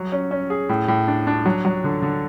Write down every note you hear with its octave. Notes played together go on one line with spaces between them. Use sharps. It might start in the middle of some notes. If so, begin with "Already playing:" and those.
Already playing: F#3
C#4
C#4
G#4
A2
A2
D4
D4
F#3
F#3
D3
D3